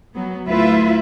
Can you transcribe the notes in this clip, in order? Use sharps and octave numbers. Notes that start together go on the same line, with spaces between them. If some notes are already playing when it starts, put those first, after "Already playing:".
F#3 B3
D2 E4 F4 B4 E5